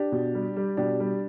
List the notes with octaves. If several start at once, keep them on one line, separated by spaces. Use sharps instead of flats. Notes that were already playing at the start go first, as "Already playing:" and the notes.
Already playing: D4 G4
B2
G3
G3
B2 D4 G4
G3